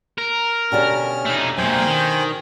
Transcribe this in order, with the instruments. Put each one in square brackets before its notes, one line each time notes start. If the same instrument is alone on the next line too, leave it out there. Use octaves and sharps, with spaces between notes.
[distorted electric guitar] A#4
[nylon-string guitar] B2 D3 G3 [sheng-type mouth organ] C#4 F6
[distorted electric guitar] A3 D#4
[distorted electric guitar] F#2 A#2 [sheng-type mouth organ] C5 G5 G#5
[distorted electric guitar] D#3